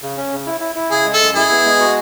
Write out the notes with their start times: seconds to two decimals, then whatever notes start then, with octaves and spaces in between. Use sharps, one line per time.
0.02 C#3
0.17 C#4
0.32 C#3
0.46 E4
0.60 E4
0.75 E4
0.90 C#3 G#4
1.05 G#3
1.13 A4
1.20 F#2
1.36 E4 G#4
1.51 B3
1.65 G#3
1.80 F#4